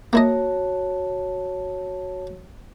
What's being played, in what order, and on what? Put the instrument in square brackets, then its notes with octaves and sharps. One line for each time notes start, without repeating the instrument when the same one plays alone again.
[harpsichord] A#3 E4 D#5 [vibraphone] F#4 C#5 A5